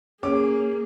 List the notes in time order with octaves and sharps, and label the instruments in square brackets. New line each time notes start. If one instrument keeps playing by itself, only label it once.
[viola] A#3 G#4 [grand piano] C#4 D6